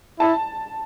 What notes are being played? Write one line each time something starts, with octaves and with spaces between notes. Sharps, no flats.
E4 A5